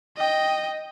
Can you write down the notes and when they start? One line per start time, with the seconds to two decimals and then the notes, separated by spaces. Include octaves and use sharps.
0.17 D#5 G5